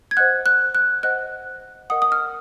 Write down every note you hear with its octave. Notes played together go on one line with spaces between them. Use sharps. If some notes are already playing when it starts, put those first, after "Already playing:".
G#6
C5 D#5 F#5 F#6
F#6
F#6
C5 D#5 F#5 F#6
A#4 D#5 F#5 D#6
D#6
F6